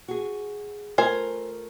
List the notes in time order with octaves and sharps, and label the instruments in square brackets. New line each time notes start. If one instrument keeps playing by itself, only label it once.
[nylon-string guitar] F#4 G#4
[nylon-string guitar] A3 F4 A#4 [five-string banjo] C5 G#5